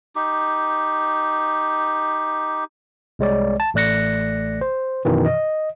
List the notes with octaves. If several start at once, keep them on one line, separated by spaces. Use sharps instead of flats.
D#4 G4
C2 G#3 C#5 D5
A5
A1 A3 D5 F#6 A#6 C#7
C5
F#2 B2 D#3 E3
D#5